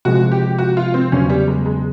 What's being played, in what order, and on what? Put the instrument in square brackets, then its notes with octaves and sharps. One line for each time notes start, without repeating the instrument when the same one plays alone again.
[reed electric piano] C3 F3 G#3 [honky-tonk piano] F#4
[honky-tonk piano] G4
F#4
F4
C4
[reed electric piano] E2 C#3 F#3 B3 [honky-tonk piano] C#4
[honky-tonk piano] G3
G#3
G#3